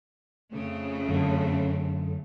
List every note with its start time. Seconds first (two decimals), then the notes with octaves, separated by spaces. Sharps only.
0.52 F2 C#3 A3
1.09 F#2 D3